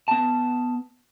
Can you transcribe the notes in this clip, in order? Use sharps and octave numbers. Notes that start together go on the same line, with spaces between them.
B3 A5